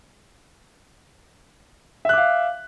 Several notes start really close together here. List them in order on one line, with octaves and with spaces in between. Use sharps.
E5 F#6 D6 F5